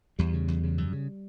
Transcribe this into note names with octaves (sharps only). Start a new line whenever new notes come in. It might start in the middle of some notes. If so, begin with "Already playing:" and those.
E2 G3
C#3
E2
C#3
F#2
C#3